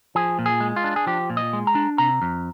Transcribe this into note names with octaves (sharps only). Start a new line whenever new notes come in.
F3 G#4
A#2
G#4
G#3
F4
D4
G#4
F3 G4
A#2
D#5
G#3
A#5
D4
C3 A#5
F2